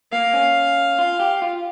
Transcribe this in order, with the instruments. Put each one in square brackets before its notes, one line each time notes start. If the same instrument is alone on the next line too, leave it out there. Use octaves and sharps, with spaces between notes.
[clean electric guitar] A#3 [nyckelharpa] F5
[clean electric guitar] C#4
F4
G4
F4